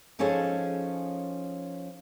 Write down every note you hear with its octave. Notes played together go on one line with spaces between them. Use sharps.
F3 C#4 D#4 G#4 A4 C#5